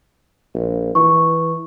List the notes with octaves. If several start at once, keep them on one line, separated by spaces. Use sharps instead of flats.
A#1
E3 C#6